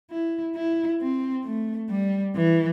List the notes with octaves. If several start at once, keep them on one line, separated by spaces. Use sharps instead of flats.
E4
E4
C4
A3
G3
E3